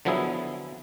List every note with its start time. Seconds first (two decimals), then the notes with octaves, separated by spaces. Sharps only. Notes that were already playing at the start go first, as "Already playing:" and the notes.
0.05 D3 F3 F#3 B3 E4 G#4